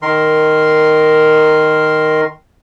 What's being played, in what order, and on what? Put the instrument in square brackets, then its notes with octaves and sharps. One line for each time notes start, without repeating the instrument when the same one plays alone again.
[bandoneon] D#3 A#4 C6